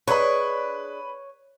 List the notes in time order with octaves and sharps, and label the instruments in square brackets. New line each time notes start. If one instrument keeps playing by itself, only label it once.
[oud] D4 G#4 D#5 [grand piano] B4 B5 [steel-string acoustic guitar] C#5